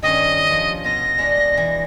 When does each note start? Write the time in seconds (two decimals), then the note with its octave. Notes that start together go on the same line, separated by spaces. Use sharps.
0.02 G2 D#3 C#4 D#5
0.51 F3
0.84 B2 F4 A#6
1.18 G#3 D4
1.57 E3